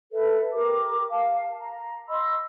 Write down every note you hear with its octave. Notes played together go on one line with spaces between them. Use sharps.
A4 B4 E5
G4 A#4 D6
F5 A5
A#5
D#5 B5 C6 E6